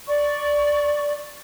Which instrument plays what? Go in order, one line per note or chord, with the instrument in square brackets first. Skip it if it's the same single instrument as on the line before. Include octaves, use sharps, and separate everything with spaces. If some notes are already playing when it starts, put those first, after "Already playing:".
[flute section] D5 C#6